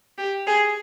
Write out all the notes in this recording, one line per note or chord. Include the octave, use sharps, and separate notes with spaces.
G4
G#4